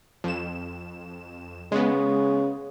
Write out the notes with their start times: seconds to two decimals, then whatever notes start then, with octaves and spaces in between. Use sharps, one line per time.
0.24 F2 E7
1.72 C#3 G#3 B3